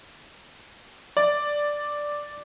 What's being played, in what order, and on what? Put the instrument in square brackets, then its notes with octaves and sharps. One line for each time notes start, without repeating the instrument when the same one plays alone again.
[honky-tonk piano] D5